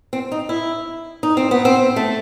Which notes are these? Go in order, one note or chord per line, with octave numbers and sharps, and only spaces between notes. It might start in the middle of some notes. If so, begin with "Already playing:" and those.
C4
D#4
E4
D#4
C4
B3
C4
A3